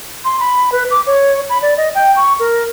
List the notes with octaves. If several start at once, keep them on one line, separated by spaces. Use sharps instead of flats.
C6
B5
B4
D6
C#5
B5
D5
D#5
G5
C#6
A#4